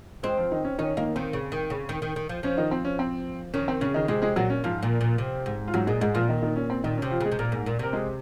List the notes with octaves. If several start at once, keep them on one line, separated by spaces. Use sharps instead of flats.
G#3 C4 G#4
F3 F4
D#3 D#4
C#4
D#3 C#4 D#4
D#3 A#3 D#4
D#3 C4
C#3
D#3
C#3
D#3
D#3
D#3
F3
F3 C#4
D#3 D#4
C4
C#4
C4
D#3 C#4
C4
C#3 C#4
D#3 D#4
C3 G#3 G#4
G#3 G#4
A#2 F#3 F#4
C#4
G#2 F3 F4
A#2
A#2
C3
G#2
F4
G#2 F#3 F#4
A#2 G#3 G#4
G#2 G#3 G#4
A#2 F3 F4
D#3 D#4
D#3 D#4
C#4
C4
A#2 D#3 D#4
C#4
C3
F3 F4
C#3 G#3 G#4
C3
A#2 A#3 A#4
G#2
A#2
C3 A#4
G#3 G#4